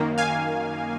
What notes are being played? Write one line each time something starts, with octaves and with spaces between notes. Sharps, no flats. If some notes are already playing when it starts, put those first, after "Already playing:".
Already playing: F#2 D#3 A#3
F5 G#5